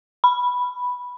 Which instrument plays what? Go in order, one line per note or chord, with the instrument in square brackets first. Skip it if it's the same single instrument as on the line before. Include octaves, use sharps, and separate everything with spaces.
[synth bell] B5